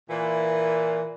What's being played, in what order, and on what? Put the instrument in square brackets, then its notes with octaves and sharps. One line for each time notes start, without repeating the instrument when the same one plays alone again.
[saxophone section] A#2 E3